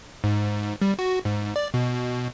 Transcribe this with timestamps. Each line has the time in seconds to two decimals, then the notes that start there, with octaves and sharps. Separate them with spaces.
0.24 G#2
0.82 G3
0.99 F#4
1.25 G#2
1.56 D5
1.74 B2